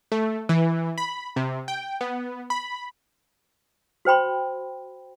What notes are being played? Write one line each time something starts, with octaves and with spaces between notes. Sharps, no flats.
A3
E3
B5
C3
G5
B3
B5
F#4 C5 G5 B5 C6